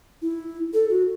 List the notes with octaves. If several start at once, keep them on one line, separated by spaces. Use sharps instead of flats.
E4
A4
F#4